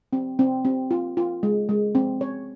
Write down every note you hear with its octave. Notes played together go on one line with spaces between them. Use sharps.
C4
C4
C4
F4
F4
G#3
G#3
C4
C#5